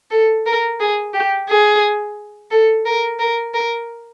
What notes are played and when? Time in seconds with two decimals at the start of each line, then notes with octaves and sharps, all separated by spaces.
0.11 A4
0.46 A#4
0.80 G#4
1.14 G4
1.49 G#4
2.51 A4
2.86 A#4
3.19 A#4
3.54 A#4